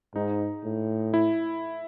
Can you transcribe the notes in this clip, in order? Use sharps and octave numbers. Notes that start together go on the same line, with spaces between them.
G#2 D#4
A2
E4